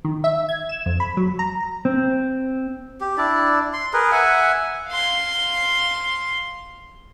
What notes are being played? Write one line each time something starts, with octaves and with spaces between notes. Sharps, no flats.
D#3
E5
G#6
E7
F2
B5
F#3
A#5
C4
G4
D4 E4 D5
C6
G#4 A#4 B4
E5 F#5 G#5
F5 C6